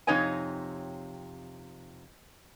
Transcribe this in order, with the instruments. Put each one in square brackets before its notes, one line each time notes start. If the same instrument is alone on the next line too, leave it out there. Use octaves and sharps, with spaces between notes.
[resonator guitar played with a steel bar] F2 C3 D#4 C#5 D#5 G#5